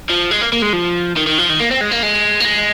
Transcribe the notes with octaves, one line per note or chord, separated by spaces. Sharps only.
F3
G#3
A#3
A#3
G#3
F3
D#3
D#3
F3
D#3
A#3
C4
G#3
A#3
G#3
A#3
G#3